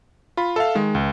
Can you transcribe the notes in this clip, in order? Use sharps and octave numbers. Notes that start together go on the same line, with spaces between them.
F4 B5
A4 E5 F5
D#3 G#3
C#2